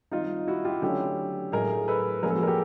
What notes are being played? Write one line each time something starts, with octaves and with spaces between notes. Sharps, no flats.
D#3 G3 C4 D#4 F4
E4 F#4
F4 G4
D3 F#3 A3 C#4 G4 A4
A2 F#3 A3 G#4 A#4
A4 B4
F3 A#3 C#4 G#4 A#4
A4
F#4 G#4
A#4
G4 A4